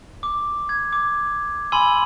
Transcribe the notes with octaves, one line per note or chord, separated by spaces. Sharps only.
D6
G#6
D6
G#5 B5 C6 E6 D#7 F#7